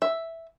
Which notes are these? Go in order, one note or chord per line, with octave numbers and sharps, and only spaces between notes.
E5